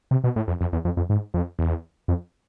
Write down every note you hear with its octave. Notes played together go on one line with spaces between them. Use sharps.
C3
B2
A2
F2
F2
E2
F2
F2
G#2
F2
E2
F2